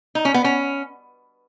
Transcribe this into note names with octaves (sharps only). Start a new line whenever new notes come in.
D#4
C#4
B3
C#4